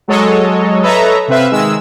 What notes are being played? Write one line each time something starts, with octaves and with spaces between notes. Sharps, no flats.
F#3 G#3 A4 C#5 D#5
A4 B4 C#5 D#5 E5 A#5
C3 C4 B4 E5 F5
D#3 G#3 E6